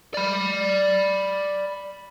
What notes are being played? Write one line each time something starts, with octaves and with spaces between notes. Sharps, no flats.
D5 B5